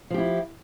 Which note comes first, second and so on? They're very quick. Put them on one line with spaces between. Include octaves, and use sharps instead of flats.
F3 G4 E4